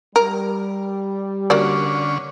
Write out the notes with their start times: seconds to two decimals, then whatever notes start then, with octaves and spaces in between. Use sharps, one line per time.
0.16 G3 A#4
1.50 D3 A#3 C#4 F#4 D5